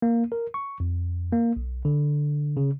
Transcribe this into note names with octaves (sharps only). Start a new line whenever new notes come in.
A#3
A#4
C#6
F2
A#3
B1
D3
C#3